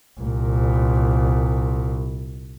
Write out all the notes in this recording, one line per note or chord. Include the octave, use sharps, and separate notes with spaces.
C2 A#2